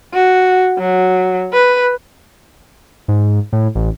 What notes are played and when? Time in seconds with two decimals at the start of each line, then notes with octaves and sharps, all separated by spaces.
0.14 F#4
0.79 F#3
1.54 B4
3.08 G#2
3.53 A2
3.75 A1